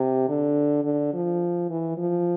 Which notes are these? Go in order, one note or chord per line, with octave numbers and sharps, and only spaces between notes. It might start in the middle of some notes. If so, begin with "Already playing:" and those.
Already playing: C3
D3
D3
F3
E3
F3